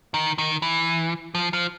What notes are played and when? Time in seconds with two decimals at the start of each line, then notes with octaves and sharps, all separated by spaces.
0.14 D#3
0.38 D#3
0.62 E3
1.35 F3
1.53 F3